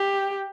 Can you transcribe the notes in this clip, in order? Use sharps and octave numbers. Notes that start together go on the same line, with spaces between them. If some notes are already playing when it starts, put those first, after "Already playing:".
Already playing: G4